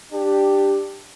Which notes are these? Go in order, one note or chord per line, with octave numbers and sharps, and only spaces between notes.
D4 G4